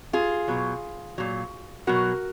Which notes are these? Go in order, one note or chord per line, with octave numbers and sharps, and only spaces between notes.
F4 G#4
B2 F#3
A#2 F#3
B2 F#3 F#4 A#4